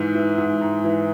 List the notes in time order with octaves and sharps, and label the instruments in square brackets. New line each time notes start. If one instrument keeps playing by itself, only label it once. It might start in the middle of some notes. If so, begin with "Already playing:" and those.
Already playing: [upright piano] G#2 E3 E5
E3
G#2
G#2
E3